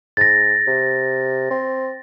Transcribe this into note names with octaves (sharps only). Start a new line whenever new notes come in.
G#2 A6 A#6
C3
C4